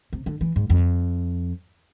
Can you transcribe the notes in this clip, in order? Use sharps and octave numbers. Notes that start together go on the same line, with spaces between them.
C3
D3
E3
G#2
F2